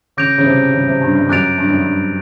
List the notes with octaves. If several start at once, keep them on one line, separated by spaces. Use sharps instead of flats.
C#3 D6 G6 A#6 D7 F7
C#3
C3
C#3
C3
G2
G2
F#2 D6 F#6 A6 D7 F7
G2
F#2
G2